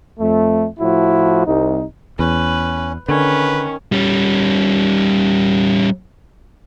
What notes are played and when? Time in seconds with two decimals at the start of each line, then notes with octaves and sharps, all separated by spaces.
0.19 F2 A3
0.80 A2 F3 E4 F#4
1.46 C2 D#4
2.19 E2 C#4 B4
3.09 D3 D#3 C#4 B4
3.92 G3 C#4